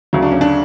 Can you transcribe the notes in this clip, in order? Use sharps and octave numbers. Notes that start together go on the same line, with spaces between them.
D2 C#3 F#3
D4
C#4
D4